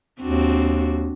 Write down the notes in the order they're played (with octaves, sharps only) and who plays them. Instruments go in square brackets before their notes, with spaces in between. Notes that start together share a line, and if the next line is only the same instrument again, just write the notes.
[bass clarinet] D#2 [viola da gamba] C4 D4 F#4